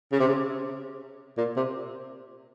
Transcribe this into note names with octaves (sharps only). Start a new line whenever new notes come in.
C#3
C3
C#3
A#2
C3